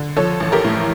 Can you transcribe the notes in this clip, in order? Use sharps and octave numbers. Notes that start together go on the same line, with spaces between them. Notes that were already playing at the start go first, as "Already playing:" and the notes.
Already playing: D3
F3 A4 C#5
A1
G4 A#4
A2